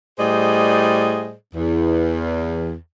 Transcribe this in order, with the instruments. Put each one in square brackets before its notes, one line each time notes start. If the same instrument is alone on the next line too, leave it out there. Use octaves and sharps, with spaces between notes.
[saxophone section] A2 G3 G#4 C5 D5 D#5
E2